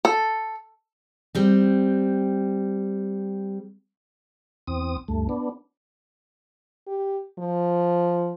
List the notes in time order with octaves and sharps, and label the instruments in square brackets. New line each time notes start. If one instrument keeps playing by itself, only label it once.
[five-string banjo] A4
[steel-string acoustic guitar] G3 C4
[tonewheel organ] E2 C4 D#6
D2 G2 A3
B3 D4
[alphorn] G4
F3